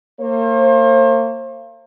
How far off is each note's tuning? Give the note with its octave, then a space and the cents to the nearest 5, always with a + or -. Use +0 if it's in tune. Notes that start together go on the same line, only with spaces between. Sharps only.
A#3 -35 C5 +40